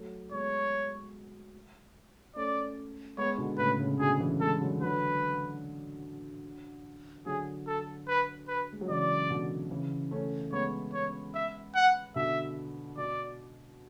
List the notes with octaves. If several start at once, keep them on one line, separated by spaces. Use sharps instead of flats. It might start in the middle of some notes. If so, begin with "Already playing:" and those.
Already playing: F#3 A3
G#3 B3 C#5
A3 C#4 D5
G#3 B3 C#5
B2 D3
A2 C#3 B4
A2 C#3
B2 D3 G#4
C#3 E3
E3 G#3 A4
D3 F#3
D3 F#3 B4
D3 F#3 G#4
A4
B4
B4
G#3
F#3
C#3 E3 D5
B2 D3
C#3 E3
A3 C#4
G#3 B3 C#5
C#5
E5
F#5
B2 D3 E5
B2 D5